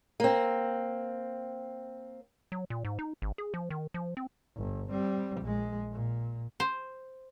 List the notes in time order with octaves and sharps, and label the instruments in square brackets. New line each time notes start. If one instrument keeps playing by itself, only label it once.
[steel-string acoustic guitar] A#3 C4
[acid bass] F#3
A#2
G#2
D#4
G#1
G#4
F3
D#3
F3
C4
[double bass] G1
G3 C4
A#1 G#3
A#2
[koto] C5